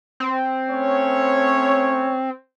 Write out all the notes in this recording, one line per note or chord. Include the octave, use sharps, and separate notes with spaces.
C4
A3 C#4 C#5